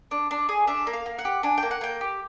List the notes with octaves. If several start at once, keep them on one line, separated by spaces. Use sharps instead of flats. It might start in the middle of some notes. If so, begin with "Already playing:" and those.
D4
D4
G#4
D4 E5
A#3
F5
A#3
F#5
G4
D4 G#5
A#3 G5
F#5
A#3 G5
G4